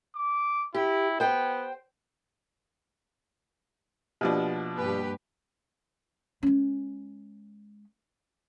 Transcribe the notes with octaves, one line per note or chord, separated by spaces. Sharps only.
D6
E4 G4
B3 C5 G5
B2 F3 A#3 D4 G4
G2 A#3 G4 B4
G#3 C#4